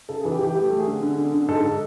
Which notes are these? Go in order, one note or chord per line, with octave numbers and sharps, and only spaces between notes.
C#3 A4
E3 G#4
G4
E3
G4
A3 G4
A3
G#4
D3
D3
D3
D3
G#2 A4
A4